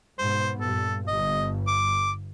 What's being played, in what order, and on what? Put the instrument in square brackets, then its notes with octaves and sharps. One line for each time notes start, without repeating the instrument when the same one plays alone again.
[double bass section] G#2 B2 B3 [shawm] C5
[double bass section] G2 A#2 [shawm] A4
[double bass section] G1 G2 [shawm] D#5
[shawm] D6